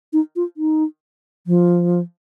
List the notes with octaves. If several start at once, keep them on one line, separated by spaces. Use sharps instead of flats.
D#4
F4
D#4
F3